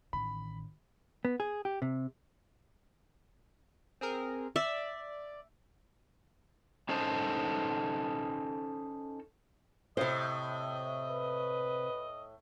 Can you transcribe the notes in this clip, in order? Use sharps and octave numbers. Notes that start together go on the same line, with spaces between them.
A1 D#3 B5
B3
G#4
G4
C3
C4 G#4 A#4
D5 E5
C#4 D#4 A4 C5
A2 C3 C5 D#5
B4